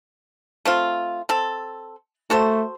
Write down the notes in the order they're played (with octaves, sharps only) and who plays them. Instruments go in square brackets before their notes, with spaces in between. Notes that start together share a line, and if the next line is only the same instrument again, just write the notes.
[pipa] A3 C4 F4
C4 A4
[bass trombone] A3 [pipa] F#4 A4 C5